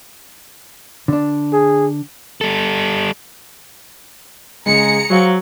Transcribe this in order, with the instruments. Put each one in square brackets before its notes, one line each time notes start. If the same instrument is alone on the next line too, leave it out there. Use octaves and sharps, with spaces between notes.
[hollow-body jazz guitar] D3 D4
[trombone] G#4
[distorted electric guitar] G3 A4
[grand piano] C#3 G#3 [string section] G#4 A#5 C#7
[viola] F#3 [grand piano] C5 F5